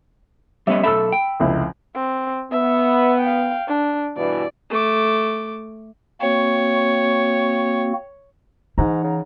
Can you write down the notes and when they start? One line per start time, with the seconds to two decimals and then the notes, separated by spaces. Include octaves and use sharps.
0.67 G3 B3 C#4 D#5 E5
0.83 B1 A4 E5 B5 E6
1.12 G5
1.40 F1 C#2 E4
1.95 C4
2.51 B3 E5
3.21 F5 G5
3.68 D4
4.17 G2 B2 E3 D5
4.70 A3 D6
6.21 A#3 C4 F#4 C#5
8.78 G#2 E3 D#4 F#5 A#5
9.04 C#3